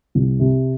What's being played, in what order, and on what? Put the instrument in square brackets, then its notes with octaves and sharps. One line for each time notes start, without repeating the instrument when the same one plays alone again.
[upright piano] C2
C3